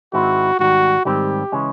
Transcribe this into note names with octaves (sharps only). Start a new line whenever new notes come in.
G#2 D#3 G#3 C4 E4 F#4
G#2 D#3 G3 F#4
G#2 D#3 G3 C4 G4
C#3 E3 G#3 C#4